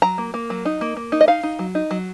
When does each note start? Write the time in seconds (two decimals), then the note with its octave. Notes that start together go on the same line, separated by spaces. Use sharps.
0.02 F#3 A#5
0.18 A#3
0.34 A#3
0.50 F#3
0.65 D#4
0.81 A#3
0.97 A#3
1.12 D#4
1.21 D#5
1.28 D#4 F5
1.43 D#4
1.59 F#3
1.75 D#4
1.91 F#3